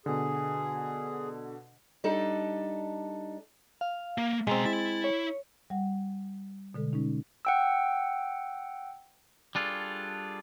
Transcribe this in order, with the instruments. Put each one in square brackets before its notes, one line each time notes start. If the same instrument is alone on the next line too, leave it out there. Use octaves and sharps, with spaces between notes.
[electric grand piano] B2 D3 [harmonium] G#4
[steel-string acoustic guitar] G3 D4 D#4 A4
[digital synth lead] F5
[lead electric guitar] A#3
[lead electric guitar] B2 A#5 [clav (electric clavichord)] G#3 C4
[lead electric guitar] E4 [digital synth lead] A6
[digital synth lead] C#5
[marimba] G3 F#5
B2 D3 G#3 A4
G#3 C#4 D#4
[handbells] F#5 G5 E6
[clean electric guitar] G3 D4 F4 G#4 A4